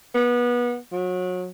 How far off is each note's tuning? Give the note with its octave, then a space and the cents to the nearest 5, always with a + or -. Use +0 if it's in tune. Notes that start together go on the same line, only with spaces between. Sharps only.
B3 -25
F#3 -30